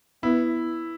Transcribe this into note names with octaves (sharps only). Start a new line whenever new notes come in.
B3 E4